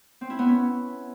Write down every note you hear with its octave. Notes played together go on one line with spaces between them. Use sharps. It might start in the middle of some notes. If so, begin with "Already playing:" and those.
C4
E4
B3
C#4